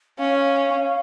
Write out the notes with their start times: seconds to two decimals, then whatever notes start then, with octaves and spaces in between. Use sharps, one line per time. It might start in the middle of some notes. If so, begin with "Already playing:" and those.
0.18 C#4 F5